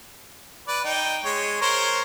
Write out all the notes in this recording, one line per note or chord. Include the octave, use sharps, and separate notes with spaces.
B4 D5
D#4 G5
G#3 C#5
A#4 C5 C#5